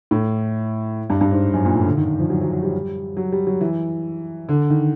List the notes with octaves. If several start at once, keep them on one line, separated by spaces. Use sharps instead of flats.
A2
G2
G2
G#2
F#2
A#2
A2
D3
D#3
F3
F#3
F#3
F#3
G3
F#3
G3
F#3
E3
D3
D#3